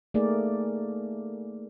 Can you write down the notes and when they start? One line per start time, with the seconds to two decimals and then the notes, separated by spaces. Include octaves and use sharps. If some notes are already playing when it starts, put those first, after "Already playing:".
0.14 A3 A#3 D#4 G#4 A#4 D5